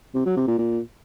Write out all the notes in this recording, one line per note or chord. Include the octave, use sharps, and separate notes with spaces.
C3
F#3
C3
A#2
A#2